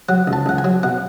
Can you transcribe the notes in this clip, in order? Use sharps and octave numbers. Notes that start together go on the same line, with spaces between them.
F#3 F#5
C#2
A5
C#2 F#5
G#5
F#3
B2 F#5